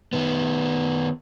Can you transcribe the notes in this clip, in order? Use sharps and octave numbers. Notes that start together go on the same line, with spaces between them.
D#3 B3